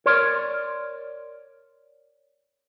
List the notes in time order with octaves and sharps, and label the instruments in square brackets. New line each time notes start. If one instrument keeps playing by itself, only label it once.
[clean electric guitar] A#4 C#5 D5 C6